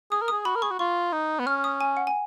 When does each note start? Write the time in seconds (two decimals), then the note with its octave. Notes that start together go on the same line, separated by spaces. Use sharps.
0.11 G#4 D#6
0.22 A#4
0.28 G#4 D#6
0.45 F#4 B5
0.56 A#4
0.62 G#4 C#6
0.71 F#4
0.79 F4 C#6
1.13 D#4
1.39 B3
1.47 C#4 F6
1.64 D#6
1.81 G#5
1.97 F#5
2.07 G#5